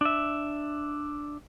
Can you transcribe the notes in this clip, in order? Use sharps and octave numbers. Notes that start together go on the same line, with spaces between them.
D4 E5